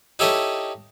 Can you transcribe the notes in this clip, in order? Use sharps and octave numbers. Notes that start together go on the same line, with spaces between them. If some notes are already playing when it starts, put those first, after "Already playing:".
D#4 E4 G4 A4 C#5 D#5